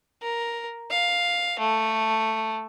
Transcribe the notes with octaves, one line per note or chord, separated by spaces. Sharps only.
A#4
F5
A3